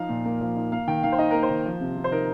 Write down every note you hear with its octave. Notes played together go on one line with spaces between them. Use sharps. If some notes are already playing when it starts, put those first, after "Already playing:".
Already playing: F3 D#4 F5
A#2
A#3
F3
D#4
A#3 F5
D#3 G5
D#3 F5
C5
D#4 D#5
A#3 A#4
C5
D#3
F3
C3
C3
C5
D#4 A#4